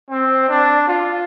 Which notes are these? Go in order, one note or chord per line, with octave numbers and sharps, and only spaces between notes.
C4
D4
F4